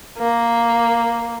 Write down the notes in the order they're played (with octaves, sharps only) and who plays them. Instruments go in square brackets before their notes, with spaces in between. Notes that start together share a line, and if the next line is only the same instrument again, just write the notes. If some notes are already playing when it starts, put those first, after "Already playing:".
[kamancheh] A#3